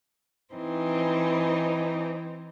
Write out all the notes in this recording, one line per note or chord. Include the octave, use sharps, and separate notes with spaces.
E3 C4 D#4